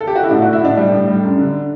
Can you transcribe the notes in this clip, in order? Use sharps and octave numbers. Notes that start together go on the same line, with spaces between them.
A4
G4
F#4
E4
A2 D4
A2 F#4
E4
A2 D4
G3
A2
G3
F#2
D3